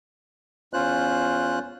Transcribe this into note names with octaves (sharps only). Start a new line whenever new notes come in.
E2 C#4 F4 C5 F#6